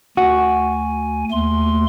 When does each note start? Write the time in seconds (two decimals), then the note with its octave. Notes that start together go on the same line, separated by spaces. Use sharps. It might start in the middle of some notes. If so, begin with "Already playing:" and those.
0.17 D2 F#4 G#5
1.32 D#2 A3 C6